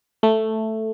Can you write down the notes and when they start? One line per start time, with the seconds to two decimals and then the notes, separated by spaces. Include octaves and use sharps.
0.23 A3